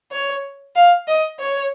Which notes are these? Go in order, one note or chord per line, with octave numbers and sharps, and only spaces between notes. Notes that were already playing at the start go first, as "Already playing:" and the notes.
C#5
F5
D#5
C#5